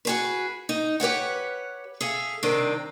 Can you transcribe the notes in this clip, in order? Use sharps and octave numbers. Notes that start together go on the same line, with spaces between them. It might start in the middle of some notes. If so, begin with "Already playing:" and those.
F#4 G#4 B4
D#4
G4 B4 C#5 F#5
G#4 A4 E5 F5
G2 C3 D#3 C4 D4